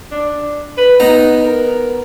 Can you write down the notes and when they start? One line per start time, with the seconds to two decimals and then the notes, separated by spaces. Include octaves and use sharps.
0.12 D4
0.77 B4
1.00 B3 D#4 A#5
1.44 A#4